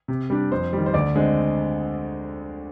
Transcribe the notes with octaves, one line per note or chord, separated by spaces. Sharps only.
C3
G3 D4
F2 C5
D#3 G3
C5
D2 D5
D3 G#3 C4